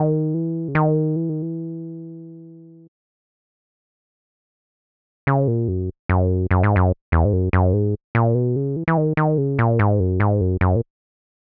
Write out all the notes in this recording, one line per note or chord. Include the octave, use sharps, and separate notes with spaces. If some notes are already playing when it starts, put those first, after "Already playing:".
Already playing: D#3
E3
C#3
D#3
E3
D#3
E3
C#3
A#2
F#2
F#2
F#2
G#2
F#2
E2
G#2
F#2
F#2
G#2
A#2
B2
C#3
E3
E3
D#3
D#3
C#3
A#2
G#2
F#2
G#2
F#2
F#2
A#2